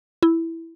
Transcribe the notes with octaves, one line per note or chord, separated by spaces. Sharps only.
E4